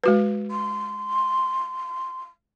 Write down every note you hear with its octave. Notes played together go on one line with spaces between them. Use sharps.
G#3 F#4 B4
C6